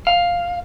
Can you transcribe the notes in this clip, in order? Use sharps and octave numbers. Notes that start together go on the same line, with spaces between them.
F5